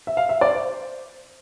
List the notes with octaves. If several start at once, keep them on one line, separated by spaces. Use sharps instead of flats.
E5
F5
E5
D5
C5